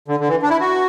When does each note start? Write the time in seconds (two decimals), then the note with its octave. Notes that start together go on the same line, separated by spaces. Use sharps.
0.08 D3
0.20 D3
0.28 E3
0.42 D4
0.50 E4
0.60 F#4